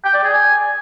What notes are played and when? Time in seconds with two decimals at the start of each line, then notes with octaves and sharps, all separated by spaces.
0.05 G5
0.14 D5
0.23 G#4
0.32 G#5